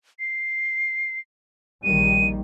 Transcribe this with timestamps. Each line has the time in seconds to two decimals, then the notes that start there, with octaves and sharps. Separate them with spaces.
0.20 C7
1.84 A#1 D#3 G3 D#7